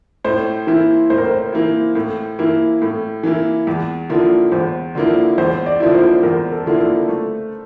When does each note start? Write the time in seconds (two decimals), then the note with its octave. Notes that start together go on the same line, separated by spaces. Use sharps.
0.24 A2 C5
0.67 E3 A#3 E4
1.10 A2 C5
1.18 A#4
1.26 C5
1.53 E3 A#3 E4
1.95 A2
2.39 E3 A#3 E4
2.82 A2
3.23 E3 A#3 E4
3.67 E2
4.09 D3 F3 A#3 E4
4.52 E2 C5
4.95 D3 F3 A#3 E4
5.38 E2 C5
5.66 D5
5.80 D3 F3 A#3 E4
5.95 C5
6.23 E2 A#4
6.52 A4
6.66 D3 F3 A#3 E4
6.81 A4
7.09 A3